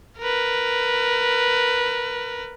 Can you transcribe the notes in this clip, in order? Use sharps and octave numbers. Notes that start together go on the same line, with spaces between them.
A#4 B4